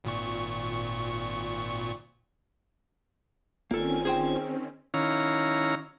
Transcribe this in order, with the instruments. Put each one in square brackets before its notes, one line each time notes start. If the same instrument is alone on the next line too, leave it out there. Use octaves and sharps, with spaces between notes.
[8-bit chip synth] G#1 A#2 C#6
[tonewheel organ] G1 F4 G#5 [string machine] D#3 C4 C#4 [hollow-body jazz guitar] A#3 A4
[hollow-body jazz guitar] G#4 C5 G5
[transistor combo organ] D#3 C#4 E4 C#5 F5 A#5